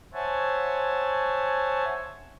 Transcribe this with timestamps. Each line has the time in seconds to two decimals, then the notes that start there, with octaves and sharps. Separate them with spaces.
0.14 C5 C#5 E5 F#5 G#5 A5